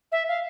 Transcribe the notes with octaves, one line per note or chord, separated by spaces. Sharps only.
E5
F5